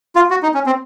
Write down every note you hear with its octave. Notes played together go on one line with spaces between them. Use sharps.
F4
F#4
D#4
C#4
C4